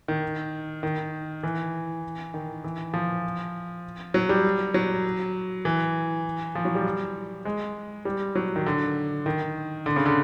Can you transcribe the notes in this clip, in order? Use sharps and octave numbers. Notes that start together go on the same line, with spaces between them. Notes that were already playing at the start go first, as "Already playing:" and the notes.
D#3
D#3
E3
D#3
E3
F3
F#3
G3
F#3
E3
F3
F#3
G3
G#3
G3
F#3
D#3
D3
D#3
D3
C#3
D3